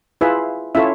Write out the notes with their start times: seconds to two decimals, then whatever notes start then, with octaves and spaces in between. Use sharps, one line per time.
0.21 E4 F4 G#4 B4 E5
0.75 C#4 E4 F4 A4 C#5 E5